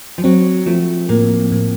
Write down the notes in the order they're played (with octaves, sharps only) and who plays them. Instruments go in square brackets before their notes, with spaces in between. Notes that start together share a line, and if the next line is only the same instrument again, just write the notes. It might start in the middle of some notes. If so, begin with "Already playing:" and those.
[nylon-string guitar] F3
[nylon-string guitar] F#3 [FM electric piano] C4
[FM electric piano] F3 [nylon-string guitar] A3
[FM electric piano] A2 [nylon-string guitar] A#3
[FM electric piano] A2